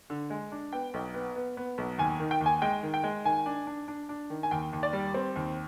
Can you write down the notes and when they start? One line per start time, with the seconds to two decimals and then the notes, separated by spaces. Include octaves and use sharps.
0.10 D3
0.30 G#3
0.52 D4
0.73 B3 G5
0.94 B1
1.14 B3
1.36 B3
1.57 B3
1.78 B1
1.98 D#2 G#5
2.20 D#3
2.31 G5
2.41 D#2
2.46 G#5
2.62 G#3 G5
2.83 D#3
2.94 G5
3.04 G#3
3.25 D#3 G#5
3.46 D4
3.67 D4
3.88 D4
4.09 D4
4.30 D#3
4.43 G#5
4.51 D#2 G5
4.73 D#2
4.83 D5
4.93 G3
5.14 C4
5.36 D#2